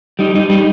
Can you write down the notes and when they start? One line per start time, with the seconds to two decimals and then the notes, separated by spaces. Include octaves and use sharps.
0.19 G3 D#4
0.34 G3 D#4
0.50 G3 D#4